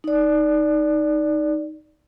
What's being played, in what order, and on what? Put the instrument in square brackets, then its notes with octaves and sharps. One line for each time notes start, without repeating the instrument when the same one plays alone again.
[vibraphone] D#4 D5